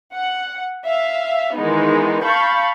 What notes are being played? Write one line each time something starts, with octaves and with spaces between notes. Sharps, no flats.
F#5
E5 F5
D#3 E3 G#3 B3 D#4
F5 A5 B5 C#6 G6